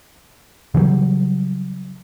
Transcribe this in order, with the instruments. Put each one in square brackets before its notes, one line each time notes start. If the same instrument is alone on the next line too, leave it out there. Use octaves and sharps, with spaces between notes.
[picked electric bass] C#3 E3 F#3 G3